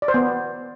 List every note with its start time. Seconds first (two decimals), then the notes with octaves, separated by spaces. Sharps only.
0.02 D5
0.08 C5
0.14 B3